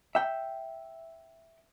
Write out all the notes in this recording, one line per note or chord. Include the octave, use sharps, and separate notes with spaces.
E5 G5